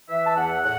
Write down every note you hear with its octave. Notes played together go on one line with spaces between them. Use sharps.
E3 E5
A5
E2 F#5
A2 F#5